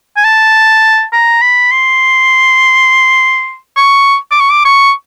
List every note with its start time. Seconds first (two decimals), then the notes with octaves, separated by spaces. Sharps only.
0.16 G#5
0.24 A5
1.13 A#5
1.42 B5
1.71 C6
3.76 C#6
4.31 D6
4.40 C#6
4.50 D6
4.65 C#6